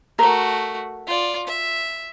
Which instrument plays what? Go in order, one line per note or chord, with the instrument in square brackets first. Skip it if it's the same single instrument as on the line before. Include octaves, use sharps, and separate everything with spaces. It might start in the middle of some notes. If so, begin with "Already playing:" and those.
[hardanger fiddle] A3 F#4 [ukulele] A#4
[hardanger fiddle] F4 D5
E5